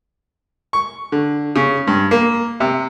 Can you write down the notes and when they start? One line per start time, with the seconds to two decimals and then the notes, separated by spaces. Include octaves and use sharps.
0.73 C#6
1.12 D3
1.56 C#3
1.87 G2
2.11 A#3
2.60 C3